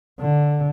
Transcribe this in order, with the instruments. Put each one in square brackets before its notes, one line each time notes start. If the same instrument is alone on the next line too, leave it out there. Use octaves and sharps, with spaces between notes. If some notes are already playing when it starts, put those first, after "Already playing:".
[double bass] D3